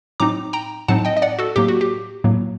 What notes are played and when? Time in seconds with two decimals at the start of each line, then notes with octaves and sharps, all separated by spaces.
0.20 A2 F#3 C4 D#4 A#5 D6
0.53 G5 A#5
0.88 A2 F#3 C4 D#4 F#5 A5
1.05 D#5 G5
1.17 D#5
1.22 D5 F#5
1.39 F#4 A4
1.56 A2 F#3 A#3 G4
1.68 F#4
1.81 G4
2.24 A2 F#3 A#3